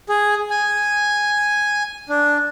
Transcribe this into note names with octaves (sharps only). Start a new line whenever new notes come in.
G#4
G#5
D4